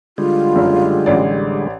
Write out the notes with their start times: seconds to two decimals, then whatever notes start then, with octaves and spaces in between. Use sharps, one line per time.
0.18 D3 G3 G#3 F4
0.56 F#1
1.06 A1 D5